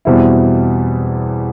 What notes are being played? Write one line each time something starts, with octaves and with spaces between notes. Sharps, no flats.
E2 B2 G3 C4 E4